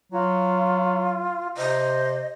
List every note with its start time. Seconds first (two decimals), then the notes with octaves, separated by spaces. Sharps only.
0.12 F#3 F4
1.57 C3 C5 D#5